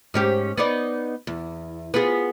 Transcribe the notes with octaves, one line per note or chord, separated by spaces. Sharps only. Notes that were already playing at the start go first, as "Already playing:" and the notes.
G#2 C#4 G4
B3 D#4 D5
E2
B3 F4 G#4